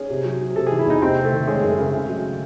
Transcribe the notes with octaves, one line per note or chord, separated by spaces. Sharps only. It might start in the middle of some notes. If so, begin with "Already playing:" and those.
Already playing: C#4 G#4
C3
F#3
F#3
C3 A4
G#4
E3
E4
E2 D#4
C3 C4
C3
A3
D#3
G#3 C#4
F#2
A3
C#3
C#3
F#3